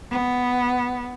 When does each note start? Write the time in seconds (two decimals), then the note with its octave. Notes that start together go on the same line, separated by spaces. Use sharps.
0.12 B3